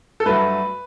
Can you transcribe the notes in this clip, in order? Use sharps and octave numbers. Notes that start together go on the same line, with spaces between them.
A4
G2 F#3 A3 B4